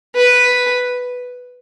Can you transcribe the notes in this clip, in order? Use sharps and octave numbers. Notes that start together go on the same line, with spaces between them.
B4